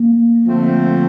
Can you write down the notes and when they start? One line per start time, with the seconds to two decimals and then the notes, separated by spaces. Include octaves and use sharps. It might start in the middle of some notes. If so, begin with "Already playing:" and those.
Already playing: A#3
0.44 D3 F3 A3 C4